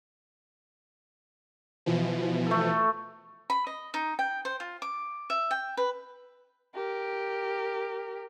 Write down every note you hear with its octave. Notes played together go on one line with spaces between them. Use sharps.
B2 E3 F3
A3 A4
B5
D#5
D#4
G5
C5
F4
D6
E5
G5
B4
G4 A#4